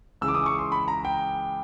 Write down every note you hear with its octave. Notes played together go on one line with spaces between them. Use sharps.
C#2 C#3 E3 G#3 E6
D6
D#6
C#6
C6
B5
A#5
G5